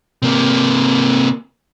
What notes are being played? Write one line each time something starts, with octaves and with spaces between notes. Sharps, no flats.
C3 A#3